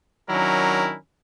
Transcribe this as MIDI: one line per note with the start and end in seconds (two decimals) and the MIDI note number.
0.29 0.95 51
0.29 0.95 54
0.29 0.95 61
0.29 0.95 62
0.29 0.95 64
0.29 0.95 70